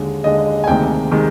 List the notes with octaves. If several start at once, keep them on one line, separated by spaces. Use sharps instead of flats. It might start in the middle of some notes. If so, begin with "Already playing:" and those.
Already playing: D#2 D3 G#3
D#2 D3 G#3 D#5
G#5
D2 C3 D#3 G#3 G5
C3 D#3 G#3